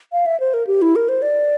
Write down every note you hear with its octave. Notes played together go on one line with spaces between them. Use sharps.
F5
E5
C5
A#4
G4
E4
A#4
C5
D5